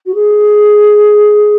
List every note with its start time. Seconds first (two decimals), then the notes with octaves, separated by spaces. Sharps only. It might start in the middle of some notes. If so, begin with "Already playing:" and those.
0.06 F#4
0.14 G#4